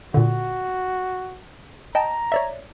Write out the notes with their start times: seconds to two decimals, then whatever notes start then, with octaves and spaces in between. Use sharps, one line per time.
0.14 A#2 D3 F#4
1.95 D#5 G5 A5 A#5
2.32 C#5 D5 E5